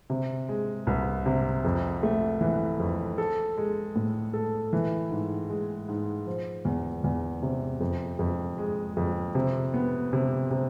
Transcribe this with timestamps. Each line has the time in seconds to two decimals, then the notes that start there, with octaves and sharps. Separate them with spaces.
0.10 C3
0.49 G#3
0.87 C2
1.26 C3
1.65 F2
2.03 A3
2.41 E3
2.80 F2
3.18 A4
3.57 G#3
3.96 A2
4.34 A4
4.73 E3
5.11 G#2
5.50 G#3
5.88 G#2
6.27 F3
6.65 E2
7.04 E2
7.42 C3
7.81 F2
8.19 F2
8.58 G#3
8.97 F2
9.35 C3
9.74 B3
10.13 C3
10.51 C3